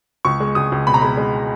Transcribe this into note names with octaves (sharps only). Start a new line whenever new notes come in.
C#2 C#6
G#3
C#2 D#6
C#2
B2 B5
A#5
G#3 B5
G#3